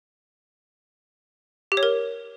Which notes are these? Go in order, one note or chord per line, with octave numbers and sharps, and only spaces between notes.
G4
C#5
A#4